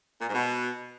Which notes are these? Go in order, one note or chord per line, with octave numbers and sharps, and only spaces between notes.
A#2
G#2
B2